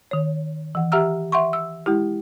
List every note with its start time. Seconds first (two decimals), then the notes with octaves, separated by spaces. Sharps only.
0.11 D#3 C#5
0.75 E3 F#5
0.92 G4 E5 F#5 A#5 E6 F6
1.32 E5 F#5 C6 C#6
1.53 E6
1.86 G#3 E4 G4